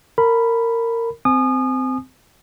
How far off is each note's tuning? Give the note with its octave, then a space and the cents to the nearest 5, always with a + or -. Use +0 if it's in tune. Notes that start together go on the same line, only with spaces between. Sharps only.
A#4 -20 B5 +0
C4 -20 G#5 +25 D#6 -30